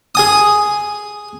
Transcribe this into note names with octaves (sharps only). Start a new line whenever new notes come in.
G#4 G#5 D#6